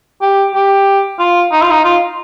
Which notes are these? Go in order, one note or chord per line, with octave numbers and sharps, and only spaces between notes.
G4
G4
F4
D#4
F4
D#4
F4